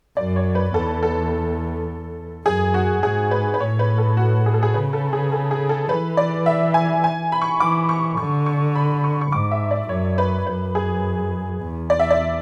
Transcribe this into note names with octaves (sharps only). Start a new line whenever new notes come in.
F#2 D5
C#5
B4
E2 A4
A4
F#2 G#4
F#4
G#2 G#4
B4
B4
A2 C#5
B4
A4
F#4
G#4
A4
G#4
C#3 B4
A4
G#4
A4
G#4
A4
E3 B4
D5
E5
G#5
G#5
B5
C#6
E3 D6
C#6
D3 C#6
C#6
B5
C#6
C#6
G#2 D6
E5
D5
F#2 C#5
B4
F#2 B4
G#4
E2
D5
E5
D5